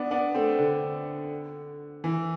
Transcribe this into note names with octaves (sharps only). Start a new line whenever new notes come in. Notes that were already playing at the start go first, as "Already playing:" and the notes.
Already playing: B3 D4
B3 D4
A3 C4
D3
E3